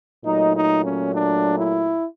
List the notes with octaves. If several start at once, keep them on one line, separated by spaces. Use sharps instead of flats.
A#2 F#3 A3 D#4
D#4
C#4
D4
E4